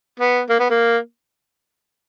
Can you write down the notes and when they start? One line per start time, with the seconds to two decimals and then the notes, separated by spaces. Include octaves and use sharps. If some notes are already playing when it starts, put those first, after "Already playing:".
0.20 B3
0.49 A#3
0.59 B3
0.70 A#3